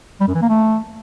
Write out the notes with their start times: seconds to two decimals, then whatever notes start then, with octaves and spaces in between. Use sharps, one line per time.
0.20 G3
0.27 F#2
0.35 E3
0.42 A#3
0.49 A3